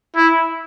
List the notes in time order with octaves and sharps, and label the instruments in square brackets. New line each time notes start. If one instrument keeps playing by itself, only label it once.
[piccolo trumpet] E4